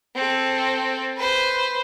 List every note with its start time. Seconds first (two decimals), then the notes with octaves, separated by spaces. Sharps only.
0.15 C4 A4
1.16 B4 C5